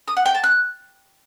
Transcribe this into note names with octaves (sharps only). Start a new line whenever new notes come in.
D#6
F#5
G5
A5
F#6